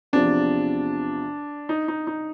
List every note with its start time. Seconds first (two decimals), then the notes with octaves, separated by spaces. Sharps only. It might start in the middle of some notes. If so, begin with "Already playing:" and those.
0.13 E2 C3 F3 D4
1.69 D#4
1.88 D#4
2.07 D#4